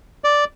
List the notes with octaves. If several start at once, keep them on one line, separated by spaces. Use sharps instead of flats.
D5